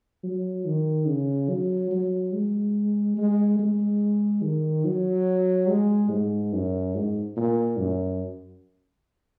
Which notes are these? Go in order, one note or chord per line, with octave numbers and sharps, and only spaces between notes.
F#3
D#3
C#3
F#3
F#3
G#3
G#3
G#3
D#3
F#3
G#3
G#2
F#2
G#2
A#2
F#2